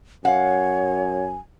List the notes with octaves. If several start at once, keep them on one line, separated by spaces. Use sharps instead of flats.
F#2 C#5 F5 F#5 G#5